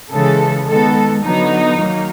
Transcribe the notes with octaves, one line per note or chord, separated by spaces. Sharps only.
C#3 E3 G#3 A4
D#3 G#3 B3 A4
D3 F#3 B3 D#4
D#3 F#3 A#3